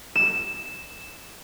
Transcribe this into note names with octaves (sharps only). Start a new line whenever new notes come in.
E7